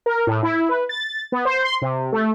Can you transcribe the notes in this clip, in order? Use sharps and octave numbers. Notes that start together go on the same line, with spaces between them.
A#4
A2
E4
B4
A6
B3
C5
C6
C3
A3